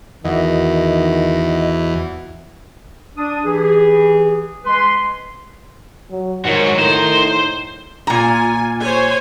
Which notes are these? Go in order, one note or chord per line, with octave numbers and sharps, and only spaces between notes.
E2 D#3 F#4 D#5 E5 F#5
D4 D#6
E3 G4 G#4
G#3 B4 C6
F#3
G#2 D#3 F#4 C#5
A2 D#4 A#4 C5
A#2 F4 G#5 A#5
C5 C#5 G#5